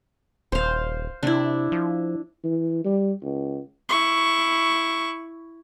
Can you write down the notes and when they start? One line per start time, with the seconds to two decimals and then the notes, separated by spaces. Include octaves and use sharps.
0.52 D#1 C5 F5
1.23 C3 D4 E4
1.72 F3
2.44 E3
2.85 G3
3.23 C#2
3.89 E4 C#6